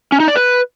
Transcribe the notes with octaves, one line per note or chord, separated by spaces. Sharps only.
C#4
D#4
D5
B4